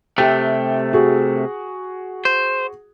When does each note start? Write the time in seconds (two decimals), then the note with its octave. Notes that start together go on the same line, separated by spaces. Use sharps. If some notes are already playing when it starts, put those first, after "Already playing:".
0.18 C3 A3 G4 G5
0.93 F#4 G#4
2.25 C5